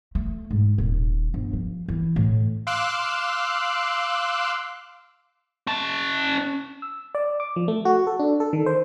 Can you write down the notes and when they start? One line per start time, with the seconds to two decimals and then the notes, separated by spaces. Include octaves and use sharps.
0.15 A3
0.51 G#2
0.78 D#1
1.34 G1
1.53 F3
1.88 E3
2.16 A2
2.67 F5 C6 D6 E6 F#6
5.67 C#4 A5
6.82 E6
7.15 D5
7.40 D6
7.56 F3
7.68 A3
7.85 F#4
8.07 A4
8.19 D4
8.40 A4
8.53 D#3
8.66 C5